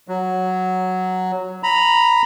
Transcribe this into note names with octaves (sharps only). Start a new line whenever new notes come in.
F#3
A#5 B5